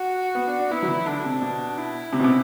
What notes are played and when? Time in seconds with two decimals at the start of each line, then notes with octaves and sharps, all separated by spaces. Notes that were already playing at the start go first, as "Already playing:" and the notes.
Already playing: F#4
0.35 B3
0.47 D4
0.59 D4
0.71 B3 E4
0.82 F#3
0.88 E3
1.06 D3 D4
1.24 C3
1.41 B2
1.77 E4
2.13 C3
2.20 B2
2.24 C3